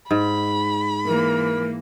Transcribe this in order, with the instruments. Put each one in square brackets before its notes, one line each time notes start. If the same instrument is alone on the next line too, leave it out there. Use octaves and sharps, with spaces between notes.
[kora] G#2 [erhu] B5
[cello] E3 A#3 [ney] A#4